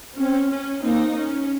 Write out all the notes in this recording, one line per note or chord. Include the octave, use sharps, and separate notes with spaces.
C4 C#4
C#4
A#3 C4 D#4
C#4